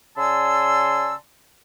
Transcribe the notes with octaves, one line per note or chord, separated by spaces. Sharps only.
C#3 D5 G#5 A5 C6 E6